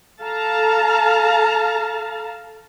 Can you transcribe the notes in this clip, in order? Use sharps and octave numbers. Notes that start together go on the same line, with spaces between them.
A4 F5 A5 A#5